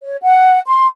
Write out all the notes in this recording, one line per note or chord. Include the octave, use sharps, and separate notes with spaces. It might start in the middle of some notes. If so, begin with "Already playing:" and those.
C#5
F#5
C6